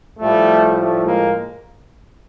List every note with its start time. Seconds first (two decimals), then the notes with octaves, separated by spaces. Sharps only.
0.19 A2 F3 G3 A3
0.76 G3 A3
1.04 G#3 A#3